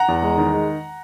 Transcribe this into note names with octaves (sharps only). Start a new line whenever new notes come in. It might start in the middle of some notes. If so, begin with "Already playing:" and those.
Already playing: F#5 A#5
E2
G#3
D#3
G#3